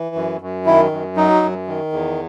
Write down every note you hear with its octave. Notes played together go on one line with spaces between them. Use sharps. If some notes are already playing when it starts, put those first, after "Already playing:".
Already playing: E3
F#2
F#2
D#3 E4
F#2
F#3 D#4
F#2
D#3
E2